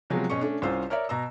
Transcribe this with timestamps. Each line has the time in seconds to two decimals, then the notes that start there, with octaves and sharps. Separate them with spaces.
0.10 C3 F3 F#3 G#3 B3
0.30 B2 C#4 D#5 C#6 C#7
0.41 A3 C#4 D4
0.62 C2 C#4 F4 C5 E6
0.90 A#4 C#5 D5 E5
1.09 B2 A#5 E6